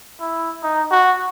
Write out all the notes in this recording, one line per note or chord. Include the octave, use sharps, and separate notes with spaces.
E4
D#4
F#4